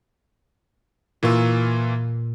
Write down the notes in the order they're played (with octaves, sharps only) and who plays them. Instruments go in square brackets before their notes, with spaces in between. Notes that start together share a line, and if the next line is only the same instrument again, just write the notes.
[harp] A#2 C#6 E6 [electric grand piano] E3 A#3 F4